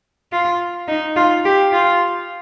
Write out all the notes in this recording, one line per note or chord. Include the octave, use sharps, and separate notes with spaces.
F4
D#4
F4
G4
F4